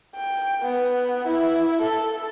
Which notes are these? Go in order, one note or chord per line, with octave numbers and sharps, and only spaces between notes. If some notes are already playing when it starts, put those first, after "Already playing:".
G5
B3
E4
A4